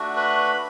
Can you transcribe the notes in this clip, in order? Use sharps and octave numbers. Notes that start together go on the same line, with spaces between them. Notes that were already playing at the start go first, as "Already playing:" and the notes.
Already playing: A3 D4 F#4
B4 B5